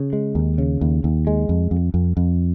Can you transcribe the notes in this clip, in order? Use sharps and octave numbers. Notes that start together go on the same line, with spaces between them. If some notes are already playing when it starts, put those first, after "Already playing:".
Already playing: C#3
G#3
D#2
C#3
D#2
D#2
G#3
F2
F2
F2
F2